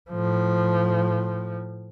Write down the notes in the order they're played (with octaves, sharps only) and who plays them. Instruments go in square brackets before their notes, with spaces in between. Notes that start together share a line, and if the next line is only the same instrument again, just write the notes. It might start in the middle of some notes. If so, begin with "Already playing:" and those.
[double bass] A2 F3